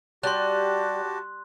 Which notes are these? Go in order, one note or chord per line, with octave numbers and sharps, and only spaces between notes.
G3 F#4 G4 A5 C6 F#6